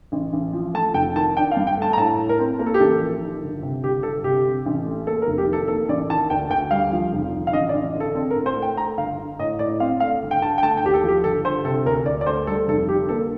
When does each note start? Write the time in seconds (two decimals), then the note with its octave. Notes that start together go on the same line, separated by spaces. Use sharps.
0.12 A1
0.33 A1
0.53 F3
0.74 A3 A5
0.94 F1 G5
1.16 D#3 A5
1.36 D4 G5
1.51 F5
1.57 G2
1.67 G5
1.77 A3
1.82 A5
1.93 A#5
1.98 A2 A5
2.18 A2
2.29 A#4
2.39 C4
2.59 A#3 A#4
2.66 A4
2.74 G4
2.80 A1 A4
3.01 F3
3.22 D#3
3.42 G1
3.63 C3
3.83 G1 G4
4.03 G1 A4
4.24 C3 G4
4.45 C4
4.66 A1
4.85 A3
5.07 A#3 A4
5.22 A#4
5.28 F1
5.38 G4
5.48 D#3 A4
5.68 A#3 A4
5.88 A1 D5
6.10 D#3 A5
6.30 D2 G5
6.50 D2 G5
6.71 G3 F5
6.92 F3
7.13 F1
7.34 D3
7.47 F5
7.53 A1 D#5
7.69 D5
7.74 A1
7.95 D3
8.00 A4
8.15 C4 A4
8.30 A#4
8.35 A2
8.46 C5
8.56 A3
8.62 G5
8.77 A3 A#5
8.97 G1 F5
9.18 D3
9.39 A2 D#5
9.59 A2 D5
9.80 C4 F5
10.00 A3 F5
10.21 G1
10.31 G5
10.42 D3 A5
10.58 G5
10.63 A3 A5
10.77 G5
10.84 D#2 G4
10.94 A4
11.04 F3 G4
11.24 G1 A4
11.45 G1 C5
11.65 C3 A4
11.86 D2 A#4
12.06 D2 D5
12.21 D5
12.26 A3 C5
12.47 G3 A4
12.68 F1 A4
12.89 D3 G4
13.09 A#3 A4